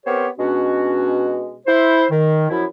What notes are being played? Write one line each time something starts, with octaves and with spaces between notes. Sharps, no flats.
B3 C4 G4 A#4 C5 C#5
B2 G#3 C#4 D4 F#4
E4 C5
D#3
F#2 F3 E4